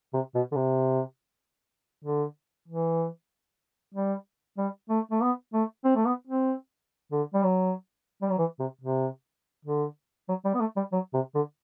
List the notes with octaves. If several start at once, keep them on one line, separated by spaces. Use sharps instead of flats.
C3
B2
D3
C3
D3
E3
G3
G3
A3
A3
B3
A3
C4
A3
B3
C4
D3
G3
F#3
G3
F#3
E3
C3
C3
D3
F#3
G3
B3
A3
G3
F#3
C3
D3